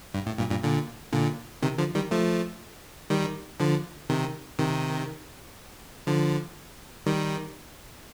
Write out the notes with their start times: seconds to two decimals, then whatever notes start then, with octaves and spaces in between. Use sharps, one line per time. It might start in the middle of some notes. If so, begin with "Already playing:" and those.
0.14 G2
0.26 A2
0.38 G2 A#2
0.50 G2 A#2
0.63 A#2 D3
1.13 A#2 D3
1.62 C3 D#3
1.78 D3 F3
1.95 D#3 G3
2.11 F3 A3
3.10 D#3 G3
3.60 D3 F3
4.09 C3 D#3
4.59 C3 D#3
6.07 D3 F3
7.06 D#3 G3